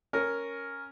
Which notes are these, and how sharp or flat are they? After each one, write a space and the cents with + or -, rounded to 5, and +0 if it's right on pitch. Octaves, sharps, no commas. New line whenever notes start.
C#4 +0 A#4 +0